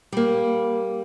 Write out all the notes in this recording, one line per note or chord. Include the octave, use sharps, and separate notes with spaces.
G3 A#3